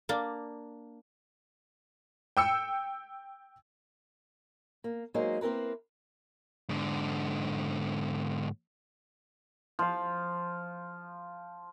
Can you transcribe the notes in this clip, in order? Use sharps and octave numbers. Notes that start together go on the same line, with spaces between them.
A#3 D4
G5 E6 C#7
A#3
F#3 G#3 A#3 D#4 C5
A#3 C4 E4 A#4 B4
G#2 D3
F3 F5